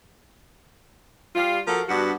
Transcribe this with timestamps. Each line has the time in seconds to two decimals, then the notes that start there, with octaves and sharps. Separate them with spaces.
1.36 G3 F4
1.67 F3 F#4 A4 A#4
1.89 G2 B3 D4 F#4